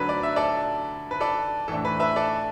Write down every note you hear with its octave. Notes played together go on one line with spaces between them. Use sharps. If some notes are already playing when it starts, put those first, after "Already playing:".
Already playing: D2 D3 F#3 D4 B4
D5
E5
A4 D5
B4
A4 D5
A2 E3 A3 D4 A4
B4
B4 E5
A4 D5